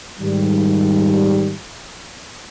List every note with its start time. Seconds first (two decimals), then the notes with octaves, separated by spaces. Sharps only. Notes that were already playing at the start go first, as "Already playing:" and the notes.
0.19 G#2 D#3 G3